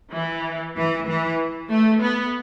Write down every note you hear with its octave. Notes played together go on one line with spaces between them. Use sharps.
E3
E3
E3
A3
B3